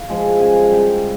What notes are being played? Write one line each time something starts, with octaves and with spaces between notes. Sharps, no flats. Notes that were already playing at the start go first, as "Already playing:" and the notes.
Already playing: F5
F3 G#3
C#3 G#5
F5
G3 G5